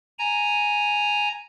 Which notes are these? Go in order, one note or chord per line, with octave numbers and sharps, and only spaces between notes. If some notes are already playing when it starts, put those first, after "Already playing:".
G#5 A#5